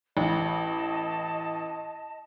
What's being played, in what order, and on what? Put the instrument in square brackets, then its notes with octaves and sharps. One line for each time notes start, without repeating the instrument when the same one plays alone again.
[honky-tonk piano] A1 [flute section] D#5 A5